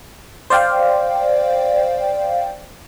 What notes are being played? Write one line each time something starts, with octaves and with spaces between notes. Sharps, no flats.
C5 D5 F5 G5